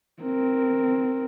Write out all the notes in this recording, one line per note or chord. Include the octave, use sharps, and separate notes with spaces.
C4 A#4